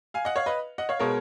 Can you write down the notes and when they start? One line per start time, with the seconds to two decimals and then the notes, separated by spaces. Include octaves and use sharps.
0.14 F5 G#5
0.25 D#5 F#5
0.36 C#5 F5
0.46 B4 D#5
0.78 D#5 F#5
0.89 C#5 F5
0.99 B2 G#3 A#4 C#5